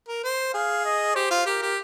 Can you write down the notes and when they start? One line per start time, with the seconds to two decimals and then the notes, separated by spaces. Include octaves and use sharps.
0.08 A#4
0.24 C5
0.54 G#4 F5
0.85 D#5
1.15 G4 C5
1.31 F4
1.46 G4 A#4
1.62 G4